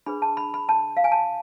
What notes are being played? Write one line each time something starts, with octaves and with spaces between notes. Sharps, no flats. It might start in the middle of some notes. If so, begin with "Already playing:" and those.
D4 G#4 B4 B5
A5
B5
B5
A5
F5
G#5
A5